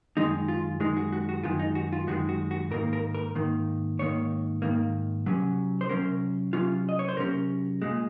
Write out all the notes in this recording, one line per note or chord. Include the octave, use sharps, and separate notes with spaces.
F#2 D#3 G#3 D#4
F4
F#2 D#3 G#3 D#4
F#4
F#4
F#4
F#2 D#3 G#3 F4
D#4
F#4
F4
F#2 D#3 G#3 F#4
F#4
F#4
G#2 D#3 A#3 A#4
A#4
A#4
G#2 D#3 A#3
G#2 D#3 A#3 C#5
G#2 D#3 A#3
C3 F#3 C#4
C5
C3 F#3 C#4 A#4
C3 F#3 C#4 F4
D#5
C#5
C5
C3 F#3 C#4 A#4
A#2 G#3